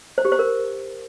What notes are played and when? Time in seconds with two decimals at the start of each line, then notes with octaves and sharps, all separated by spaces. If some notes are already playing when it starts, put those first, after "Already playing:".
0.18 C5
0.25 G4
0.32 C5
0.39 A#4